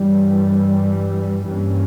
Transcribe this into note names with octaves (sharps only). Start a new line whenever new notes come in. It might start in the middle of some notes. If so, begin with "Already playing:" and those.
Already playing: G2 E3 G3
G2 E3 G3 A#3 C#4